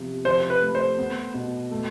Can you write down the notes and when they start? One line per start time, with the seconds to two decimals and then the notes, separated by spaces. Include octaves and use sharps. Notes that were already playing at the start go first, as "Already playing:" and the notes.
Already playing: C3 F3 B3
0.25 F3 C5
0.50 B4
0.62 A3
0.75 C5
0.98 B3
1.34 B2
1.71 A3